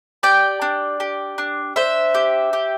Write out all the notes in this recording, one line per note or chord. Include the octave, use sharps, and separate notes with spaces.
G4 D5 G5
D4
G4
D4
D4 C5 E5
G4
G4